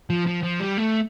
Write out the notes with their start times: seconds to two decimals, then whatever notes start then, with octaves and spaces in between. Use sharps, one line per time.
0.10 F3
0.27 F3
0.43 F3
0.60 G3
0.78 A3